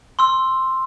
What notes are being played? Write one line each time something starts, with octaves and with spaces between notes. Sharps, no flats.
C6 E6